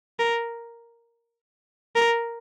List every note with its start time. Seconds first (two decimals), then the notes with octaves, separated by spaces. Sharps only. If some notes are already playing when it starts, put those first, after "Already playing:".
0.19 A#4
1.96 A#4